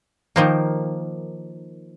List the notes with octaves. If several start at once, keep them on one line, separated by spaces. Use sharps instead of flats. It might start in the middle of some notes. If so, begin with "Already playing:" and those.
D#3 F3 A#3